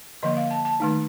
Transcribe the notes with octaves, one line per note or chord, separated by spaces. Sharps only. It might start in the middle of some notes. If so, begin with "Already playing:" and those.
D3 F3 A#3 D#5
F5
A5
A5
D#3 A3 D#4